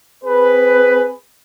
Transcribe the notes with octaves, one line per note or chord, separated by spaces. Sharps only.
C4 G#4 B4